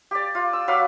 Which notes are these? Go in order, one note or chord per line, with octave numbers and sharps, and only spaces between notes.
G4 D5
F4
E6
F#3 B4 F5 D6